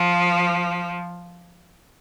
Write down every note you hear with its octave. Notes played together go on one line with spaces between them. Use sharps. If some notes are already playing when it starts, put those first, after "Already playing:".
Already playing: F3